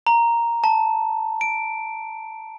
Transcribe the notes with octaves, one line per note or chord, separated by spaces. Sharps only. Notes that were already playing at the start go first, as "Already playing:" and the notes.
A#5
A5
D7